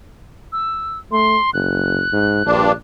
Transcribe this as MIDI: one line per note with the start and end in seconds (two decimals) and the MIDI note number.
0.52 0.98 88
1.12 1.37 57
1.12 1.50 84
1.54 2.03 30
1.54 2.75 90
2.12 2.46 44
2.46 2.73 34
2.46 2.72 43
2.46 2.72 62